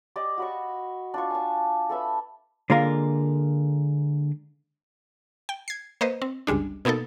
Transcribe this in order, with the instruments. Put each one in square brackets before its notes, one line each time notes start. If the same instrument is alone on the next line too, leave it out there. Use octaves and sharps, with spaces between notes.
[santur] G4 D5 D#5
F#4 B5 C#6
D4 F4 C#6
G#5 A5
A4 B4 E5 B5
[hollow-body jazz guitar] D3 G#3 A#3 F4 A#4
[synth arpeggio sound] G5
G#6 C7
A#3 B4 C5 D#5
C4
G1 C#2 G3 G#3 D4
B2 A#3 B3 D#4 A4